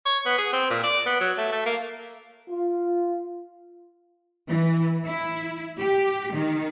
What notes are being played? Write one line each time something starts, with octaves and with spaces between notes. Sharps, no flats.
C#5
B3
G#4
C4
A#2
D5
B3
F#3
A3
A3
A#3
F4
E3
E4
G4
D#3